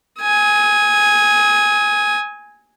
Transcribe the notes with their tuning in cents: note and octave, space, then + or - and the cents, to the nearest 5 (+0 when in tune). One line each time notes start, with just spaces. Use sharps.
G#5 +0 D#6 +40